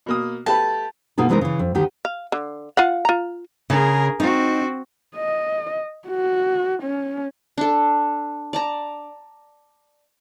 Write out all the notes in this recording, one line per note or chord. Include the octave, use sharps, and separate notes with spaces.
B2 A#3 D#6
A3 G4 B4 A5
B2 A#3 D#4 G#4 A4
C3 E3 G#3 A3 D#4 A#4
C#3 E3
F2
D2 D#3 G4
F5
D3
F4 F5 F#5
F4 A#5
C#3 G#4 A#4
C4 D#4 F#4
D#5
F#4
C#4
D4 A4
D5 A5 A#5